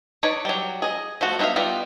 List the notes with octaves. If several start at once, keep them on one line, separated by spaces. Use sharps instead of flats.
D#4 B4 C#5 D5
F#3 G3
G#4 D#5
F3 A3 F#4
B3 D#4 C5 E5 F5
G3 B3 D#4 F4